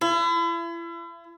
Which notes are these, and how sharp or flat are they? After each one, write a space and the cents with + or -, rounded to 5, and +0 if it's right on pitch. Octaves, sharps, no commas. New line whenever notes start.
E4 +40